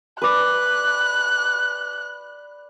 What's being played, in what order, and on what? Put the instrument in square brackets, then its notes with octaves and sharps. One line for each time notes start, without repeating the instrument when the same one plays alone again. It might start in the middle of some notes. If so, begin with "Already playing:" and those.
[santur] B4 D5 [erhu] F#6